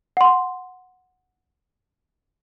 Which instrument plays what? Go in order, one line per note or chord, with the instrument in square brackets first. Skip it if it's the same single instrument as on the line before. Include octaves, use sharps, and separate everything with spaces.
[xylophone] F#5 C6